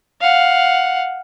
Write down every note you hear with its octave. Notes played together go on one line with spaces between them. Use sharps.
F5 F#5